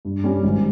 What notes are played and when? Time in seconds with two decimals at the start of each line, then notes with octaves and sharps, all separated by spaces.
0.05 G2
0.24 G3 C#4 G4
0.44 G#1